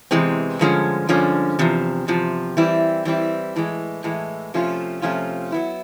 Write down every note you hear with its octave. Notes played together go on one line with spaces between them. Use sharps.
E2 C3 E3 G#3 C4
G2 D3 F3 G#3 C#4
G2 D3 F3 G#3 C#4
E2 C3 F3
E2 C3 F3
E3 G3 C4 E4
E3 G3 C4 E4
A2 E3 G#3
A2 E3 G#3
C3 F3 A3 C#4 F4
C3 F3 A3 C#4 F4
F#3 B3 E4